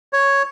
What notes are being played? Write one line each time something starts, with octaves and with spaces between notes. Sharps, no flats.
C#5